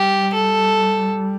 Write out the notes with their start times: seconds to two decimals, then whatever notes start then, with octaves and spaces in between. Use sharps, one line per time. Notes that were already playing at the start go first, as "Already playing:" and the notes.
Already playing: G3 G4
0.34 A4